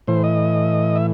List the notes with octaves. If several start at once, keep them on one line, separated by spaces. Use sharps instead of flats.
A2 E3 C5
D#5
E5